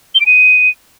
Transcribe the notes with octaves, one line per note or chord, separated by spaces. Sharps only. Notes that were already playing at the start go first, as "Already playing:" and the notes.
G7
D7
D#7